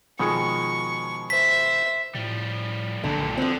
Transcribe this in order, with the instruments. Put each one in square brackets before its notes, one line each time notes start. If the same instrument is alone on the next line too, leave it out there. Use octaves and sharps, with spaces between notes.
[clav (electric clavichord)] B2 D#3 G#3 [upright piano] F3 G#4 C#7 [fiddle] C#6
[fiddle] C5 E5 [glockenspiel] B6
[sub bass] A2 [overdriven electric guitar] F3 G3
[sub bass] B1 [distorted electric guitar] G2 A#2 [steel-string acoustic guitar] D3
[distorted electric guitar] D3 [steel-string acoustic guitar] F3 C4